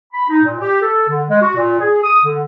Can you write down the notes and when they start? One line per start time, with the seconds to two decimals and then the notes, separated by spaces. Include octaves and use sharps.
0.13 B5
0.29 D#4
0.43 A#2
0.60 G4
0.82 A4
1.09 D3
1.30 G#3
1.41 F#4
1.55 A#2
1.80 G#4
2.03 D#6
2.23 D3